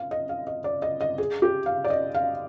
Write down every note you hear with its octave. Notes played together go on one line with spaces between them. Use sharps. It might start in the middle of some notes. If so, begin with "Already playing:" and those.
Already playing: F5
D#5
F5
D#5
D5
D#5
D#5
G#4
G4
F5
D5
D#5
F5